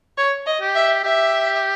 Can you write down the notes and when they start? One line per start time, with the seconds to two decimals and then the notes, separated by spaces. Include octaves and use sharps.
0.17 C#5
0.46 D#5
0.61 G4
0.75 E5
1.03 G4 E5